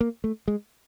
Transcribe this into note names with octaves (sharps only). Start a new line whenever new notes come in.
A#3
A3
G#3